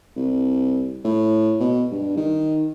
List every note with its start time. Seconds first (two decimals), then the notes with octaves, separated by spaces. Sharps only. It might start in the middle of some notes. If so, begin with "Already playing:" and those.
0.16 C2
1.05 A2
1.60 B2
1.91 G2
2.17 D#3